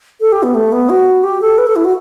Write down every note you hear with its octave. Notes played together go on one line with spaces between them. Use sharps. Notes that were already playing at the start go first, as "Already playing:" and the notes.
A4
G4
B3
A3
B3
F#4
G4
A4
B4
A4
E4
F#4